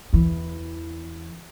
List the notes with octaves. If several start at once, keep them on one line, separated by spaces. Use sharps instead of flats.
E2 E3